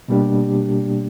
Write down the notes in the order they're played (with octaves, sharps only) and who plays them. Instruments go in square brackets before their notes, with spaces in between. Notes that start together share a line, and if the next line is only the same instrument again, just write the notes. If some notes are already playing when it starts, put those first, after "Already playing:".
[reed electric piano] B2 G3 A#3 D4 G4